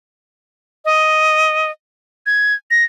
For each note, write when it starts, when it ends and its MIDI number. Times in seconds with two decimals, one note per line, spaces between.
0.85 1.71 75
2.26 2.54 92
2.71 2.84 94